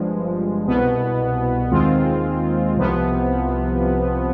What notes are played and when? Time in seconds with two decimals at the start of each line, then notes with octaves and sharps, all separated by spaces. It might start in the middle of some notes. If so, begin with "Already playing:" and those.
Already playing: G1 G2 F3 G#3
0.67 C2 B2 B3
1.71 D#2 D#3 G#3 C4 F4
2.76 C2 C3 F3 B3